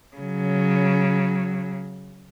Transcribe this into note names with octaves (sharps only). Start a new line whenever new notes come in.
C#3 F#3